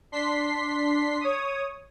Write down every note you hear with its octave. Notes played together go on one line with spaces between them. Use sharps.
D4 C6 B6 C7
C#5 D#6